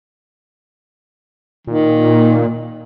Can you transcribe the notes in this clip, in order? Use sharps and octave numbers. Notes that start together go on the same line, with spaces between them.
A#2 D#3